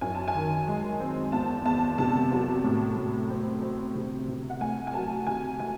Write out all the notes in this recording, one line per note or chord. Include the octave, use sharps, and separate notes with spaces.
F#2 G#5
A5
G#5
D#3
G#3
C4
E2 A5
E2 A5
C3 A5
F#3
A2
A2
C4
C4
C3
C3
F#5
A3 G#5
G#5
F#3 A5
C3 G#5
A3 G#5